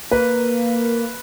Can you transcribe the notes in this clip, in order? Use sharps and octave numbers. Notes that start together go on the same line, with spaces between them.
A#3 B4